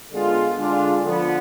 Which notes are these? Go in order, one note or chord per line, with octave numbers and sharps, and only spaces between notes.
D3 G#3 B3 F4
D3 G#3 D4 F4
D3 F3 B3